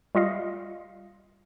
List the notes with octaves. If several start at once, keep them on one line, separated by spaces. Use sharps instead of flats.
G3 F4 D#5 F5